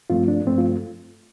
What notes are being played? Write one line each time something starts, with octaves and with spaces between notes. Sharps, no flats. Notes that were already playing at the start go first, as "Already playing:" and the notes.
G2 F3 A3 C4 F4
D4
G2 F3 A3 C4
F4